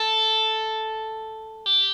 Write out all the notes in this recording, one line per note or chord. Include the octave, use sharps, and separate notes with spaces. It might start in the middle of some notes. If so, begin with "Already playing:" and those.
Already playing: A4
G4